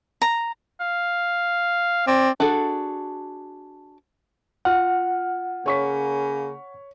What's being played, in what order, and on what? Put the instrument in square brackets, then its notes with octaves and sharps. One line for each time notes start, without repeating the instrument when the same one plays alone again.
[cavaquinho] A#5
[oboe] F5
[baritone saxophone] C4 [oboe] D5
[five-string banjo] D4 F#4 G#4 A4
[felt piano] F4 F6 [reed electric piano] F#5
[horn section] C#3 A#3 [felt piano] C#5 C#6 B6